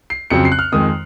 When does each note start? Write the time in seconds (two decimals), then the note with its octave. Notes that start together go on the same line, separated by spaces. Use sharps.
0.10 C7
0.30 F2 C#3 F#3 C4 C#7
0.45 C7
0.52 F#6
0.59 F6
0.72 F2 D#3 G#3 D#6